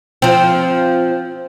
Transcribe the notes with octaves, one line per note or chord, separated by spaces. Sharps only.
F3 C4